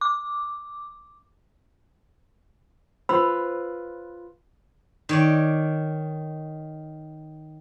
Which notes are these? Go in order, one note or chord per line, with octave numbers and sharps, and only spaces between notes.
D6
F4 B4 C5 B5 E6
D#3 C#5 D5